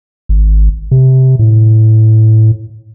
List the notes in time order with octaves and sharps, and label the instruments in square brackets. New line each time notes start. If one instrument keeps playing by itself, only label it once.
[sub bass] G#1
C3
A2